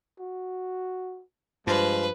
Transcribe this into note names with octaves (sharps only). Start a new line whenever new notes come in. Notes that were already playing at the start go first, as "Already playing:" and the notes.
F#4
G2 F3 G#3 B4